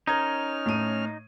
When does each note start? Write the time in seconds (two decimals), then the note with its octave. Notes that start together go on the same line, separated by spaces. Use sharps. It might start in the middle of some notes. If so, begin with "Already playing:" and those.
0.07 C#4 D#4 A#4 F6 G#6
0.66 A2 D#7